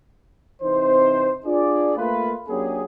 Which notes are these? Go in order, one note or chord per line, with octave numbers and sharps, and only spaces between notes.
C3 E3 C4 D#4 C5
D4 F4 G#4 D5
A3 A#3 F4 B4
F#3 A#3 C#4 D4 G4 G#4